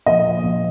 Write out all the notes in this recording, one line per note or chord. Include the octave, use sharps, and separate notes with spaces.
A#2 F3 D#5
A#2 F3